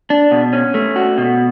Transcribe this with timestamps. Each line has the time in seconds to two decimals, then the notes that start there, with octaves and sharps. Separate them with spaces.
0.10 D4
0.31 B2
0.53 C#4
0.74 A3
0.96 F#4
1.18 B2